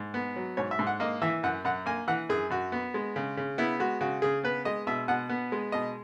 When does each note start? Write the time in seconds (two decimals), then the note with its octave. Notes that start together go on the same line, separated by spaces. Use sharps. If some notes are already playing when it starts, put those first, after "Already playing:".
Already playing: G#2
0.14 B3
0.36 F#3
0.57 G#2 C#5
0.71 E5
0.79 G#2
0.87 F#5
1.00 A#3 D#5
1.22 E3 E5
1.43 F#2 F#5
1.65 F#2 F#5
1.86 A#3 G#5
2.08 E3 F#5
2.29 F#2 G#4
2.50 F#2 F#4
2.72 B3
2.94 G#3
3.16 C#3
3.37 C#3
3.58 B3 E4
3.80 G#3 F#4
4.01 C#3 F#4
4.22 C#3 G#4
4.44 B3 B4
4.65 G#3 D#5
4.87 B2 E5
5.08 B2 F#5
5.29 B3
5.52 G#3
5.72 B2 D#5